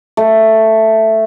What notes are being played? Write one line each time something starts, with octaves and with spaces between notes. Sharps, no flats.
A3